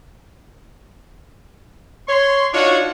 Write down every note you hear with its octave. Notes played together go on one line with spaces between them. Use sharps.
C#5 C6
D4 D#4 F4 F#4 C#5